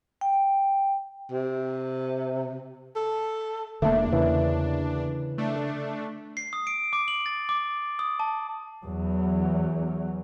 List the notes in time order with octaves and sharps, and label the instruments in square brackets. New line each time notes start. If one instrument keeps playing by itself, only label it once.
[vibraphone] G5
[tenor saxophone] C3
A4
[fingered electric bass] E1 [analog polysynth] E2 D4 [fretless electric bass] D3 A#3 [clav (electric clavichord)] A3 A4
[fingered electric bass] C#3 [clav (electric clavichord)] E3
[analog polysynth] A3 D4
[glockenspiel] C7
D#6
D7
D6
F#7
A6
D6
D#6
A5
[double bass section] E2 F#3